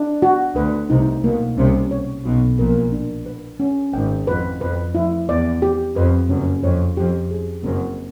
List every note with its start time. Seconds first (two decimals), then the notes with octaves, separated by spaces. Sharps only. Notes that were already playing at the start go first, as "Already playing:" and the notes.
Already playing: D4
0.22 F#4
0.56 D2 D3 B4
0.90 C2 C3 D#4
1.24 B1 B2 A#3
1.57 C2 C3 C#4
1.91 C#5
2.25 B1 B2 F#4
2.59 A#1 A#2 A#4
2.92 D4
3.26 B4
3.60 C#4
3.93 G#1 G#2 G5
4.27 F2 B4
4.60 F2 B4
4.94 F2 E4
5.28 E2 D5
5.62 G4
5.96 F2 B4
6.29 F#1 F#2 C#4
6.63 F2 C#5
6.97 F2 G4
7.31 G#4
7.64 F#1 F#2 C4